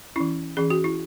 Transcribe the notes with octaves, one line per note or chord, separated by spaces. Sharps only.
E3 C#4 E4
E3 C#4 G#4
F#4
E4